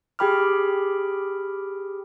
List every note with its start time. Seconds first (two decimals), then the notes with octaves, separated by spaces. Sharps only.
0.19 G4 G#4 G5 B5 D6 F6